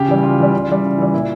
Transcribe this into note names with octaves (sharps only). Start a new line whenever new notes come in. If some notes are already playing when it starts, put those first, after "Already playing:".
Already playing: C#3 G4
E3 G3
C#3 F4
E3 G3
C#3
E3 G3
C#3
E3 G3
A#2 E4